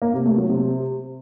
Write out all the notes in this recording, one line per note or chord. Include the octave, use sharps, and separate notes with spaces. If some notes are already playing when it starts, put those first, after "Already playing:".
A#3
C3
A3
F#3
C3